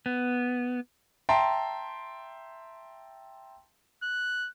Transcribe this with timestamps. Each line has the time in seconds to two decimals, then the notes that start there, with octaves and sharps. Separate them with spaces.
0.06 B3
1.29 E5 G5 A5 A#5 C6
4.03 F#6